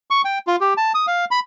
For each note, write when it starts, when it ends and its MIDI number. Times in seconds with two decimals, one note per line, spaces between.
0.11 0.22 85
0.25 0.39 79
0.47 0.56 65
0.61 0.74 67
0.77 0.92 81
0.95 1.06 87
1.07 1.25 77
1.31 1.40 83